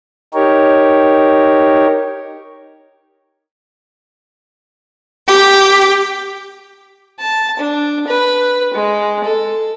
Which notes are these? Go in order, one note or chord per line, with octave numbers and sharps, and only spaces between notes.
D#4 G4 A#4 C#5
G4
A5
D4
B4
G#3
A4